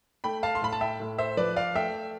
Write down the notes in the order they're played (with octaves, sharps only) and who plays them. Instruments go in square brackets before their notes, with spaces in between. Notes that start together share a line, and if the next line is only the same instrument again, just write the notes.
[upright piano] A3 G5 B5
F5 A5
C6
A2 B5
A5
E5 G5
A2
C5 E5
F3 B4 D5
D5 F5
A3 E5 G5